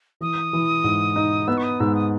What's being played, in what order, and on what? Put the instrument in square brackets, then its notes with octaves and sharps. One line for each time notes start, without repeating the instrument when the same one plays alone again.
[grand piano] E3 [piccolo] D#6
[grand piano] E3
G#2
D#4
[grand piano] B3 [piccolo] E6
[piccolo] C#6
D#6
[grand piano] G#2 [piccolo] E6
[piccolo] D#6